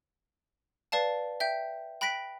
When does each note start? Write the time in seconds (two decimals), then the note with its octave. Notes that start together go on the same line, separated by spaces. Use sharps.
0.92 B4 D5 F5 A5
1.40 E5 G5 G6
2.01 G5 B5 F#6 A#6 B6 D7